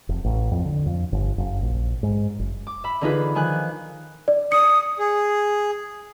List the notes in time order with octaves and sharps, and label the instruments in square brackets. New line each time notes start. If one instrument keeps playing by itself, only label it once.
[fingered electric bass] F1
A1
F2
D3
F2
G1
F#1
A#1
G#2
F#1
[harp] D6
E5 B5
D3 E3 D#4 F4 G#4 B4
D#3 F3 G#5 F#6
[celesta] D5
[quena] D#6 [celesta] C#7
[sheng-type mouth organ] G#4